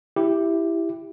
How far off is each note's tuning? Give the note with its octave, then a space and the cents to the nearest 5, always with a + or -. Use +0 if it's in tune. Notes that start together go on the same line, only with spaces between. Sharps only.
E4 +5 G4 +0